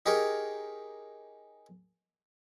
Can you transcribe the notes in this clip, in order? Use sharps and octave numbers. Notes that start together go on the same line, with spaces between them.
D#4 G4 G#4 A#4 C#5